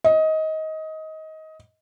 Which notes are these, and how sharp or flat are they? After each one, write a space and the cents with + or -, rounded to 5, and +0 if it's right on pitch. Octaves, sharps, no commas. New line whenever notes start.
D#5 +20